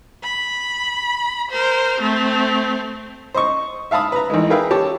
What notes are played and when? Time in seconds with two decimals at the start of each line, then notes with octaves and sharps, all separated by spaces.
0.24 B5
1.51 A#4 C5
2.00 A3 C4
3.34 C5 D#5 C#6
3.91 E5 F5 A5 B5 D#6
4.12 B4 A#5
4.30 A1 D#3 G#3
4.50 G#4 A#4 B4 E5 F5 G5
4.71 G4 C#5 A5